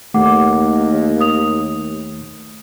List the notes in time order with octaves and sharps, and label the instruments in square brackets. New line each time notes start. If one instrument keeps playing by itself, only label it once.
[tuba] D#2 [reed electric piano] A3 [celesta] F#5 D6
[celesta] D#6 F7